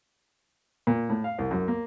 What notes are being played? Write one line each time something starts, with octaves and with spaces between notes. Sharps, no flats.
A#2
A2
F5
C2
F#2
A#3